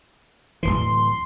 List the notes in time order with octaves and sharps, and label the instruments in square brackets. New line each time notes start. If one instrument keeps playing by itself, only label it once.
[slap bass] D1 G#1 E3 [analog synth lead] C6